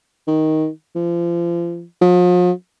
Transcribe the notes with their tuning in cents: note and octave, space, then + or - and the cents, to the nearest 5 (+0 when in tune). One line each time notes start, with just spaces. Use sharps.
D#3 +10
F3 -35
F3 +40